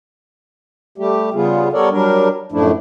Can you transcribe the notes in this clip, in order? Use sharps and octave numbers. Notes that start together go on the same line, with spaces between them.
G3 A3 G4
C#3 G3 B3 F4 G#4
G3 B3 A4 A#4 C#5 D5
F#3 G3 D4 A#4
F#2 A2 F3 A3 D4 E4